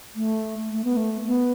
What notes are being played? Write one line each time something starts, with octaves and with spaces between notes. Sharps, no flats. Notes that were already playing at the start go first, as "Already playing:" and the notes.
A3
A3
B3
A3
B3